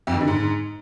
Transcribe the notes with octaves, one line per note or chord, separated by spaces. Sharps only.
F2
D#3
D3
G#2